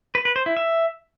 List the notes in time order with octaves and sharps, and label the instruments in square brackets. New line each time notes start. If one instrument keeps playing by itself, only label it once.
[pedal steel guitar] B4
B4
C5
E4
E5